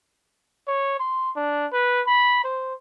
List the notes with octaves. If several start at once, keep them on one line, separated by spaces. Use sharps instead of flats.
C#5
C6
D4
B4
B5
C5